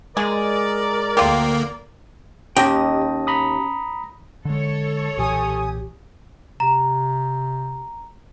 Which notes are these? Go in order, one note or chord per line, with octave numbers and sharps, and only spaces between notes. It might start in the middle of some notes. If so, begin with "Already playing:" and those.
G#3 G#4 A#4 D5
D2 A#3 F4 G4
D#2 C#4 G4 D#5 G5 A5 A#6
A#5 B5 D#6
D3 G#3 A4 C#5
B1 A#2 E3 G4 G#5 D#6
C3 A#5